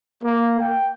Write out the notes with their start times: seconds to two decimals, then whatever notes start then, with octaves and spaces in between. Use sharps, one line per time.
0.24 A#3
0.61 G5